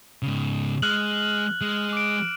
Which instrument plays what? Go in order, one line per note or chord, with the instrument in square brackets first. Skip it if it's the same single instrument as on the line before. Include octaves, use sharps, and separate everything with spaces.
[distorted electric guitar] G#2 C#3
[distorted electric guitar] G#3 [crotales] F6 F#6 F#7
[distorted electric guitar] G#3
[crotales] D6 D7